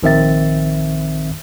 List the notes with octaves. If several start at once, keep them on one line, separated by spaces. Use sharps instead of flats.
A#1 D#3 C4 E5 A6